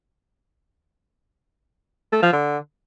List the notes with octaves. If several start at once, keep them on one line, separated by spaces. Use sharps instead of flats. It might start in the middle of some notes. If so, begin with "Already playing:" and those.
A3
F3
D3